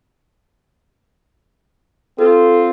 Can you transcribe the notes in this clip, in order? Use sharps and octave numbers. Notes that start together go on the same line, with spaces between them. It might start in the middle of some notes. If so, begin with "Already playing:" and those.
C4 F4 A4